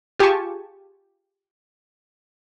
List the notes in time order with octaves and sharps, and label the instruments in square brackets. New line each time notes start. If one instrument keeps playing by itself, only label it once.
[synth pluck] F4 G4 G#4 G#5 A5 C#6